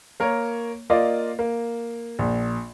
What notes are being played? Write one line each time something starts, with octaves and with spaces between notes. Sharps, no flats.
A#3 A#4 C#5
A#3 F4 D5 D#5
A#3
A#1